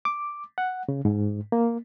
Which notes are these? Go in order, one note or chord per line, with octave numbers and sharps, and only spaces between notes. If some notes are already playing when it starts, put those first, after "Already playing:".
D6
F#5
C#3
G#2
A#3